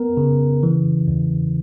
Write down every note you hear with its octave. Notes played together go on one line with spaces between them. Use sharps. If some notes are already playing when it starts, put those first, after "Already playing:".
Already playing: B3 A#4
C#3
E3
E2